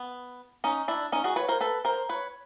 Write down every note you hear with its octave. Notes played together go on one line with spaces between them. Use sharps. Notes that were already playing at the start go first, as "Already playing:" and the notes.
Already playing: B3
C#4 D#4
D4 E4
C#4 D#4
F#4 G#4
B4 C#5
A#4 C5
A4 B4
A#4 C5
B4 C#5